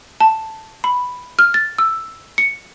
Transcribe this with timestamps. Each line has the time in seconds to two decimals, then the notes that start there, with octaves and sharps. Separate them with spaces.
0.21 A5
0.84 B5
1.39 F6
1.54 A6
1.78 E6
2.38 C#7